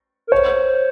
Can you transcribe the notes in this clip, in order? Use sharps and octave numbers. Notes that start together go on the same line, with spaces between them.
A#4
C5 C#5